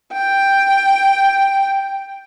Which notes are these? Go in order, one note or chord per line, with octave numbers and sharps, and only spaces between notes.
G5